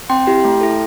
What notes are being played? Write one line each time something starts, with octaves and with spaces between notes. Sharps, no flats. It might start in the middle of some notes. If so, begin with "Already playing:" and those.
C4 G5 C6
E4 G4
A3
E4 A4